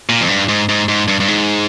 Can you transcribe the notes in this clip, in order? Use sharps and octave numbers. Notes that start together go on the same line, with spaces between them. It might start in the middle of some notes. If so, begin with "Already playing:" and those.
A#2
F2
G2
G#2
G#2
G#2
G2
G2
G#2